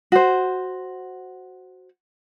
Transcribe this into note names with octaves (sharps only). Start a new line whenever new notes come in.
F#4 C5